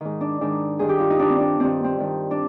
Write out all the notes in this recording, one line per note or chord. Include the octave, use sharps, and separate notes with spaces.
G#2 D#3
D4
G#2 D#3 D4
G2 D#3 G#4
G4
F4
D#4
G2 D#3 D4
C4
D4
G2 D#3 C4
C4
G2 D#3
D4